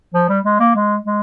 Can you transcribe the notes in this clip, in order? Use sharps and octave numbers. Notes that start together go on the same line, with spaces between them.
F3
G3
G#3
A#3
G#3
G#3